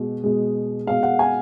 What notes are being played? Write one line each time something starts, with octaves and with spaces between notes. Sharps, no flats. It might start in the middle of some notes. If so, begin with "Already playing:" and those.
Already playing: B2 G#3
B2 G#3
B2 G#3 F5
F#5
G#5